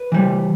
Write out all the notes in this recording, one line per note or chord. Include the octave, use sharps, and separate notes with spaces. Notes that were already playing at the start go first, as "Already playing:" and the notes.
Already playing: B4
E3 G3